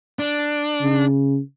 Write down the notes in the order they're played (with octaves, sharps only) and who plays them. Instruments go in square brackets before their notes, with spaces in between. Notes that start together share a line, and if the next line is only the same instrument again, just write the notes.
[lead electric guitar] D4
[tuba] C#3